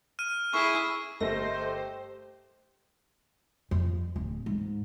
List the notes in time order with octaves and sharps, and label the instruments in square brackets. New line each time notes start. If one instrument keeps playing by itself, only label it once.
[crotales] F6 D#7
[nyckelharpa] E4 G#4 [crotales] C#6
[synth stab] G1 A#6 [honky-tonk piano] A3 A#4 D#5 [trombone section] G4 [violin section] C5
[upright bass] F2
D1
G#2